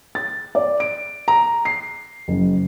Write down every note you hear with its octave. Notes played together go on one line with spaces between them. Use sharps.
A6
D5
D7
A#5
C7
F#1